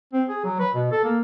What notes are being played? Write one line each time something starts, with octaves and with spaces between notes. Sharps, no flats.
C4
G#4
F#3
B4
B2
A4
A#3